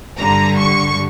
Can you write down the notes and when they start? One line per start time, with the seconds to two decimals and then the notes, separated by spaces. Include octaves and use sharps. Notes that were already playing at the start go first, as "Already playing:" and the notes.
0.18 G2 D3 G3 A#5
0.58 C#6